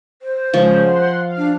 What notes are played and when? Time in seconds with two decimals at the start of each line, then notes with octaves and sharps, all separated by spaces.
0.22 C5
0.54 C#3 F3 G#3 C#4
0.85 F#5 C6
1.22 F5
1.37 D4